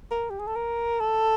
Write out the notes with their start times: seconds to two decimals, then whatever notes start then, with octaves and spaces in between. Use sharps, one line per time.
0.11 A#4
0.30 G4
0.39 G#4
0.47 A4
0.55 A#4
1.00 A4